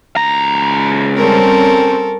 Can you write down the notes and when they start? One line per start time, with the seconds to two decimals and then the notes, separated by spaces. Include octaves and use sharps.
0.16 C#2 A#5
1.16 G3 C4 C#4 A4 A#4